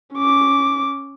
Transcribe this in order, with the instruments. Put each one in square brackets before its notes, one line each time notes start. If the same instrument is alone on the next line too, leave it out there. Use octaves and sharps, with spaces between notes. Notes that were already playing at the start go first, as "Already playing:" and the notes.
[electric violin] C#4 D6